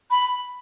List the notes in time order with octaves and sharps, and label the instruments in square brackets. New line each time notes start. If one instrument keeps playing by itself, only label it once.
[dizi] B5